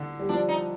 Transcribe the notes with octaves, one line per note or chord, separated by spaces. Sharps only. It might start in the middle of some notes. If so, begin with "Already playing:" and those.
Already playing: D3
G3
F3 D4
D#4